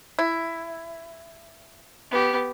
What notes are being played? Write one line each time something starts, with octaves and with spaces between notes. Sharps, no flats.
E4
B3 G4